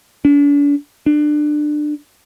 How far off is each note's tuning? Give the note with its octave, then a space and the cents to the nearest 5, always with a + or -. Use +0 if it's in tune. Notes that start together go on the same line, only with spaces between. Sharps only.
D4 -40
D4 +25